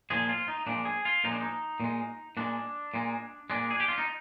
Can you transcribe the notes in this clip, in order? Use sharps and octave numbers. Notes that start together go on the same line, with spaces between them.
A#2 F3 G#3 G#4
F4
D#4
A#2 F3 G#3 D4
G#4
F4
A#2 F3 G#3 D#4
D4
D#4
A#2 G#3
A#2 G#3 D4
A#2 G#3
A#2 G#3 D4
G#4
G4
F4
D#4